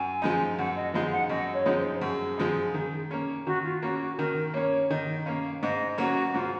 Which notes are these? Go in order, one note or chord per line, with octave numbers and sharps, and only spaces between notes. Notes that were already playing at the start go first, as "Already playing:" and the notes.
Already playing: F#2 G#5
F3 G#3 D#4
F#2 F#5
D#5
F3 G#3 D#4 F5
F#5
F#2 D#5
C#5
F3 G#3 D#4
C5
F#2 G#4
F3 G#3 D#4
D#3
A#3 C#4
D#3 F#4
F4
A#3 C#4 F#4
F#4
D#3 A#4
A#3 C#4 C#5
D#3 D#5
A#3 C#4 F5
G#2 D#5
F#3 A#3 C#4 F#4
G#2 F4